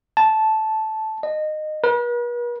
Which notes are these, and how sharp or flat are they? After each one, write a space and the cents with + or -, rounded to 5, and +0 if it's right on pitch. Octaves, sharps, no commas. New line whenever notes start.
A5 -10
D#5 -20
B4 -45